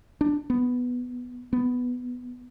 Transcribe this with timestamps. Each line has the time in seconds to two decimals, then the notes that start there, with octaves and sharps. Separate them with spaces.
0.21 D4
0.50 B3
1.53 B3